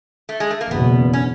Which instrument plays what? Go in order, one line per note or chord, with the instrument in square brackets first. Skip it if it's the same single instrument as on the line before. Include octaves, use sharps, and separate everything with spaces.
[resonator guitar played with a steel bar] A3
G#3
A3
A#3
[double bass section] F#1 E2 B2 [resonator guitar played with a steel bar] B3
[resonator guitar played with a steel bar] C#4